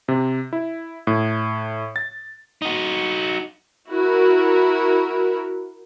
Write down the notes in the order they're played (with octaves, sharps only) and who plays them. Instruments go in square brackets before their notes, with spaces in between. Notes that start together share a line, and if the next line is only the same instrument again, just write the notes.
[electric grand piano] C3
E4
A2
A6
[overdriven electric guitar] D#4 F#4
[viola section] E4 F#4 A#4